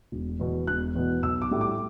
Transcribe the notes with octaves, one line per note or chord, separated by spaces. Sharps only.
E1
E2 B2
E1 F#6
E2 B2
B1 E6
D6
A2 G3
D6